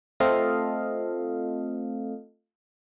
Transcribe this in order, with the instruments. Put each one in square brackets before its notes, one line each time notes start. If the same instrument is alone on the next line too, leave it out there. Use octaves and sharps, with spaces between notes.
[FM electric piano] A3 C4 F4 A4 D#5 F5